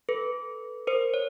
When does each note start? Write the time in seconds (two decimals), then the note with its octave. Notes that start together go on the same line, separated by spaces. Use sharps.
0.09 A4 B4
0.87 A#4 C5
1.14 C#5